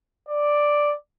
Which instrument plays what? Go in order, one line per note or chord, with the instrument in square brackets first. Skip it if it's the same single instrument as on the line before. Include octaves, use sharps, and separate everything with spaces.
[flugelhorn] D5